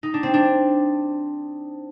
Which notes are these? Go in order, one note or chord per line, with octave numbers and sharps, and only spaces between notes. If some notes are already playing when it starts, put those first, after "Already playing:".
D#4
D4
C4
D4